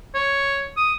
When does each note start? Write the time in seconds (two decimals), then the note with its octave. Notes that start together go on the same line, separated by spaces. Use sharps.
0.15 C#5
0.77 D#6